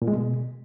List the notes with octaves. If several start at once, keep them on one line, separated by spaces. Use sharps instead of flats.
A#2
G#3
B2